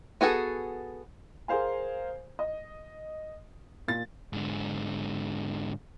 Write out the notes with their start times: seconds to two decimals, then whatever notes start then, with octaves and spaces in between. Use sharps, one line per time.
0.21 B3 F#4 G#4 A4
1.48 G#4 A#4 C5 F5 G#5
2.39 D#5
3.88 A#2 A6
4.33 G#2 D3